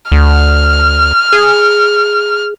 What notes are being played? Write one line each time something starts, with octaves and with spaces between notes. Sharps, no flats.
D2 F6
G#4